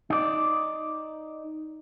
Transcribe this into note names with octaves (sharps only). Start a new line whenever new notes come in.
D#4 D5